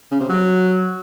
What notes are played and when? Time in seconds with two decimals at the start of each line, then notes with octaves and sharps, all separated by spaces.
0.11 C#3
0.20 C3
0.30 F#3